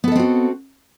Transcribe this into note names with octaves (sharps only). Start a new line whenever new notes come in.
B3 C4 F#4 A4 D#5